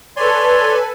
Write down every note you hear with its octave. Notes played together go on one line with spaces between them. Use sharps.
A4 B4 C#5 D5 G#5 C6